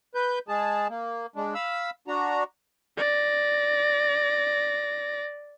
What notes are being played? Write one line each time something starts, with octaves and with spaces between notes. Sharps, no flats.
B4 G6
G#3 G#4 A5
A#3
G#3 D4
F5 B5 E6
D4 F#4 A#5
D5 A#6